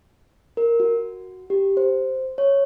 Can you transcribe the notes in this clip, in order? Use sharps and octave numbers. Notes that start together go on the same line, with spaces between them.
A#4
F#4
G4
C5
C#5